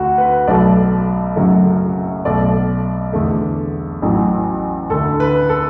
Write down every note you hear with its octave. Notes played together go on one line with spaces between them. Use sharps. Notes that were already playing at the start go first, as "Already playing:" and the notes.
Already playing: D2 D3 A3 F#4
B4
B1 B2 F#3 A3 D5
F#1 F#2 F#3 A3
B1 B2 A3 D5
E2 D3 A3
A1 A2 F#3
D2 D3 A3 A4
B4
A4